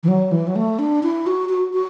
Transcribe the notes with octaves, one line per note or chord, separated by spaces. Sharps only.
E3
F#3
E3
F#3
A3
D4
E4
F#4
F#4
F#4